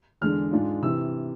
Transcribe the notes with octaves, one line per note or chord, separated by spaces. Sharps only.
E2 D3 G#3 D4 F6
G#2 G#3 D4 F4
C3 E3 E6